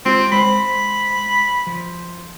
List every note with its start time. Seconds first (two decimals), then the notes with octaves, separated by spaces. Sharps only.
0.05 G#3 C4 F4 G4
0.32 G#3 C5 B5
1.67 F3